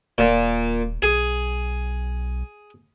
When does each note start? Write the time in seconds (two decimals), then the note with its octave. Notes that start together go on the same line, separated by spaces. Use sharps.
0.18 D#1 A#2
1.02 B1 G#4